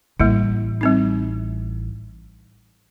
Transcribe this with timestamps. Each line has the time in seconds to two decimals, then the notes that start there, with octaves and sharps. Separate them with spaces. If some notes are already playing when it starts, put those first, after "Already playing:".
0.20 A1 G3 A#3 E4
0.81 G3 C4 D#4